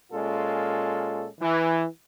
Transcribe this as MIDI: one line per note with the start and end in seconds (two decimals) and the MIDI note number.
0.13 1.28 46
0.13 1.28 56
0.13 1.28 61
0.13 1.28 65
0.13 1.28 69
1.40 1.85 52